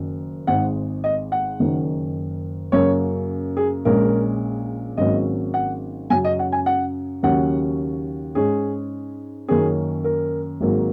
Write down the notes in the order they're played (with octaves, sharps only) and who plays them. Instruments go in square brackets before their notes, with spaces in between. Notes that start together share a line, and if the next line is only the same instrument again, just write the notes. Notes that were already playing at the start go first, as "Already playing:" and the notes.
Already playing: [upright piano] F#1 F#2 D#3 F#3
G#1 G#2 G#3 F#5
D#5
F#5
F#1 F#2 D#3
F#2 C#3 F#3 A#3 C#5
G#4
A#1 A#2 G#3 C#4 A#4
G#1 G#2 F#3 A#3 C#4 D#5
F#5
F#2 C#3 F#3 C#4 G#5
D#5
F#5
G#5
F#5
D#2 C#3 F#3 A#3 C#4 F#5
G#2 G#3 C#4 G#4
F#2 D#3 A#3 C#4 G#4
A#4
G#1 G#2 F#3 A#3